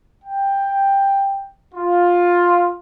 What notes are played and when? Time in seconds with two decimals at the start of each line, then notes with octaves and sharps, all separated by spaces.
0.25 G5
1.73 F4